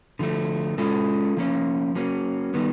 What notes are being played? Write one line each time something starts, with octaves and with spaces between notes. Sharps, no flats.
D3 F3 A3
G#3 C#4 F4 A4
F3 A#3 C#4
F#3 A#3 C#4
D#3 G3 B3